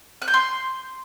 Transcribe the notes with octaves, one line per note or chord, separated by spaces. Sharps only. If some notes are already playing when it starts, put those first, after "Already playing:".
F#6
G6
C6